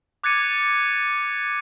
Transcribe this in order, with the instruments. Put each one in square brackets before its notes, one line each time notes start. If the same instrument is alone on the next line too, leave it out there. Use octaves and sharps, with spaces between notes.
[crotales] D6 F#6 G#6 A6 C#7 D#7